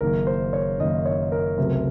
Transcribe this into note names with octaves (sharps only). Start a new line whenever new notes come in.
F#1 F#2 D#3 A#3 A#4
C5
C#5
F#1 F#2 D#3 A#3 D#5
C#5
A#4
C#2 C3 F#3 A3